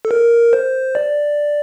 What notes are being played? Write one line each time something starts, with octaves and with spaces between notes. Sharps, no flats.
A4
A#4
C5
D5